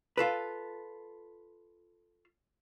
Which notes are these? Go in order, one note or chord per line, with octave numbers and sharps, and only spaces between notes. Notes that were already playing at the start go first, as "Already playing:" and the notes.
F4 A4 B4